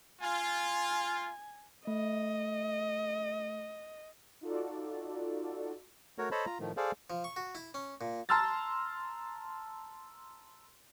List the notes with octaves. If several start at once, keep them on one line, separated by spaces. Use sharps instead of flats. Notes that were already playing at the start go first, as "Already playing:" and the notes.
F4 G#5
A3 D#5
D#4 F4 F#4 A4 D5
A3 F#4 A#4 C#5
A4 C5 C#5 D#5 A5 B5
F4 A#5
A2 D#3 F3 A3
G#4 A4 C5 D5 F5
F3
C#6
F#4
E4
C#4
A#2
A5 A#5 C6 E6 F6 A6